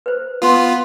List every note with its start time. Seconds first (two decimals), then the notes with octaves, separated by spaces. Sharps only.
0.06 B4 C5
0.42 B3 F4 C6 D#6